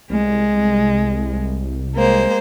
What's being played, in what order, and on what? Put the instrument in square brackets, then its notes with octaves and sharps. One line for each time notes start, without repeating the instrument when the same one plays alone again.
[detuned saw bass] C2 [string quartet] G#3
[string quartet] G#3 A#3 C5